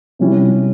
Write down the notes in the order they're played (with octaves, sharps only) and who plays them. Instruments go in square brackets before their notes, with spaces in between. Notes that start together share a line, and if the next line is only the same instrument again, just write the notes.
[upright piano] C3 G3 C#4 E4 G4